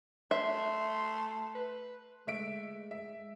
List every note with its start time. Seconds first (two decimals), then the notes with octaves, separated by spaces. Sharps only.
0.31 A3 E5 C6
1.55 B4
2.27 G#3 A3 E5 D7
2.91 E5